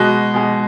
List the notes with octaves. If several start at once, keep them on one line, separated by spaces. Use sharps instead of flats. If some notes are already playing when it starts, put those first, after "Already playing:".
Already playing: B2 G#3 F#4
B2 G#3